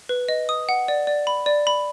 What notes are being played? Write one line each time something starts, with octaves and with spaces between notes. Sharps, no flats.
B4
D#5
D#6
F#5
D5
D5
B5
D5
B5